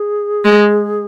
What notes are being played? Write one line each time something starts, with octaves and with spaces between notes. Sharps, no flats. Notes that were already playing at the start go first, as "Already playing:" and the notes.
Already playing: G#4
G#3